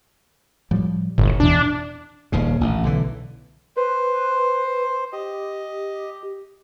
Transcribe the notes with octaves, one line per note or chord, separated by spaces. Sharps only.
A2 F3 G3
G1 A2
E2 B2 E3 D4
D#1 D#2 C#3
A1
B1 D3 E3
B4 C5
G4 D#5